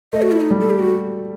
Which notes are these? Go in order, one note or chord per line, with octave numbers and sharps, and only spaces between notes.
A3 D#5
F#4
E4
D#4
G3
A4
G4
F#4